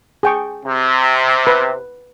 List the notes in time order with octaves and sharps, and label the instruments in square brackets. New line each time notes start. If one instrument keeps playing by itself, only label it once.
[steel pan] G#4 G5 C#6
[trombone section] C3
[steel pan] B4